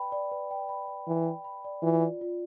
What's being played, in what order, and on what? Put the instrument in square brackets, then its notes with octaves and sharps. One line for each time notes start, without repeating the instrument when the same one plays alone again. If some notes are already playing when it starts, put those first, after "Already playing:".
Already playing: [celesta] B4 D5 G5 B5
D5
B4
G5
B5
D5
[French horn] E3 [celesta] B4
[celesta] G5
B5
D5
[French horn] E3 [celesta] F4
[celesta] D5
F4